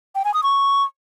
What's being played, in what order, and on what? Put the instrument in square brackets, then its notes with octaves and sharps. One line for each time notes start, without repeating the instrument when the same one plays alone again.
[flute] G5
G#5
D#6
C#6